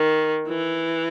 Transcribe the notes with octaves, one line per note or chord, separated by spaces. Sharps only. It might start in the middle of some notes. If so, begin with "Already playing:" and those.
Already playing: D#3
E3